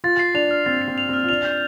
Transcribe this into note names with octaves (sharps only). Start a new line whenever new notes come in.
F4 A6
C7
D4 F7
F6
C4 A6
C7
C4
F7
C4
F6
F4
D4 F7
G6